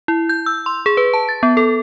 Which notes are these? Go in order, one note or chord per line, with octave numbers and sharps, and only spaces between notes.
E4
G6
E6
C6
G#4
B4
A5
A6
B3
A4